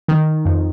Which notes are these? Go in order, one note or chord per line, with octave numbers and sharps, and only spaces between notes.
D#3
F2